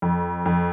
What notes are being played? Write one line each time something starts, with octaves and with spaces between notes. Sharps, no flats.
F2
F2